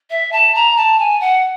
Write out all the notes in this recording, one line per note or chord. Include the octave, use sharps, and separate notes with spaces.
E5
A5
A#5
A5
G#5
F#5